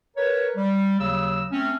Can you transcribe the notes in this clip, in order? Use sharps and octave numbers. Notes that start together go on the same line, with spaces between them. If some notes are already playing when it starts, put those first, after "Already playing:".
A#4 B4 C#5
G3
D#2 C#3 F#3 E6
A3 C4 C#4